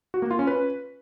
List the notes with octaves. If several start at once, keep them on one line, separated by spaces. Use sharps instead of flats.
F#4
A#3
F4
C#4
B4